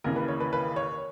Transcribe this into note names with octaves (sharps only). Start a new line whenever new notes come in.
D#2 C#3 E3 A#4
B4
C#5
B4
B4
C#5